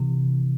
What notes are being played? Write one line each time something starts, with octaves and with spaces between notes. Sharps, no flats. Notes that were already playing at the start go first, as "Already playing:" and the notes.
Already playing: C3 E3